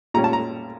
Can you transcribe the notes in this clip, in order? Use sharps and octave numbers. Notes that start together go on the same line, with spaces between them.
A#2 G3 C#4 A#5
A5
A#5